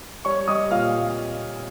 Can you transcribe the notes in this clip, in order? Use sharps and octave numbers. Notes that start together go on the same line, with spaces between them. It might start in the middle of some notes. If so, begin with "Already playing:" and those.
G3 C#5 C#6
G3 D#5 D#6
A#2 F5 F6